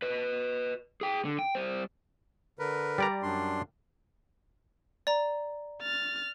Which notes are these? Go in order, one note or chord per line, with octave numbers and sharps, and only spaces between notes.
B4 D#5
G#4 G5
D3
G5
G3 C5
D3 A#4 B4
G3 D5 A#5
F#2 D4 C6
D5 A#5
F6 A6